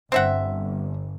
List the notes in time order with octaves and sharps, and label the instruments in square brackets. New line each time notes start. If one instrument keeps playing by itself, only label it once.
[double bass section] G1 [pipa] C4 E5 F#5